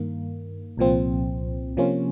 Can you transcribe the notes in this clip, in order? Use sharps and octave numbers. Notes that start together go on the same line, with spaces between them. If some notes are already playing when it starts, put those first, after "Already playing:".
Already playing: G2 D#3 A#3
C2 A#2 F3 C4
C3 F3 A#3 C#4 F4